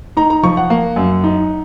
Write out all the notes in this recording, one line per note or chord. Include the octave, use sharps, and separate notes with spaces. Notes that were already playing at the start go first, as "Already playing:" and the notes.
D#4 A#5
A#5
F3 C#6
F#5
A#3
F#2
D#4